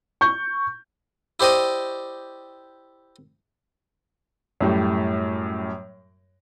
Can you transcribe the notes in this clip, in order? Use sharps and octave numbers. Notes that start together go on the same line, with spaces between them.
C#6 G6
E4 G4 C5 D5 D#5
F#2 A2 G3